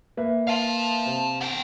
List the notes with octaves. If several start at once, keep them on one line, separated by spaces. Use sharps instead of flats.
A#3 B4 E5
F5 A5
C3
B3 G5